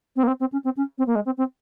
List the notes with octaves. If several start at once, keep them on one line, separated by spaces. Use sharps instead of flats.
C4
A#3
C4
C4
C#4
C4
C#4
C4
A#3
G#3
C4
C4